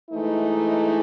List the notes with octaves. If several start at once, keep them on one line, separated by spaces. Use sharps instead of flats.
G#2 E3 A3 D#4